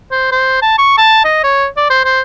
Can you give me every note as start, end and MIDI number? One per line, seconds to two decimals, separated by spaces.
0.11 0.31 72
0.32 0.58 72
0.62 0.76 81
0.78 0.95 85
0.97 1.24 81
1.25 1.39 75
1.43 1.66 73
1.77 1.88 74
1.90 2.00 72
2.05 2.21 72